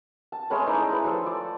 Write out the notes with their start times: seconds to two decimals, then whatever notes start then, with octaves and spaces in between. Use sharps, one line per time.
0.32 A5
0.50 G#3 A3 C#4 B4
0.66 D#4 E4 C5 D5
0.90 E4 B4
1.04 F3 A4 C5 C#5
1.26 D5